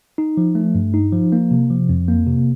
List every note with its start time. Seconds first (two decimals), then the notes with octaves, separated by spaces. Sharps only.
0.18 D#4
0.37 F3
0.55 A3
0.75 G2
0.94 D#4
1.12 F3
1.32 A#3
1.51 C3
1.70 F3
1.89 F2
2.08 A#3
2.27 C3